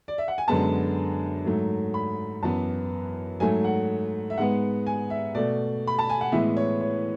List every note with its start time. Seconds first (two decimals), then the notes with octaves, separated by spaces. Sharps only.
0.08 D5
0.18 E5
0.28 F#5
0.38 G#5
0.48 F#2 D3 G#3 B3 A5
1.45 G#2 F#3 A3
1.94 B5
2.43 F#2 E3 B3 A5
3.40 G#2 F#3 A3 G#5
3.64 F#5
4.30 E5
4.37 G#2 G#3 B3 F#5
4.86 G#5
5.10 E5
5.35 B2 A3 D5
5.87 B5
5.99 A5
6.10 G#5
6.21 F#5
6.32 A2 E3 G#3 B3 E5
6.57 C#5
6.81 C#5